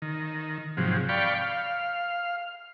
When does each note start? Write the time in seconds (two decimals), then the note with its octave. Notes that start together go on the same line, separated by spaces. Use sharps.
0.02 D#3
0.77 G#2 C3 F3 F#3
1.09 D5 F5 G5 B5 C#6
1.42 F5